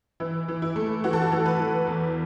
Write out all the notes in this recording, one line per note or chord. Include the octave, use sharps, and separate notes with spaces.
E3 E4
E3
E4
A3
E3 F#4
A4
F#4
E3
B4
E3
E2